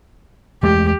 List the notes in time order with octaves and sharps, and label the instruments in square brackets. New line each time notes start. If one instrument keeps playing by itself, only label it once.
[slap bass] E2 G#3 A3 [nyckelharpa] G4